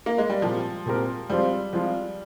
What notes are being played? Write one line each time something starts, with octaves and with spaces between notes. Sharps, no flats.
A#3
G#3
G3
A#2 F3 G#3 C4 G4 A#4
A#2 G#3 C4 G4 A#4
F3 G3 G#3 C4 F4
F3 G#3 C4 F4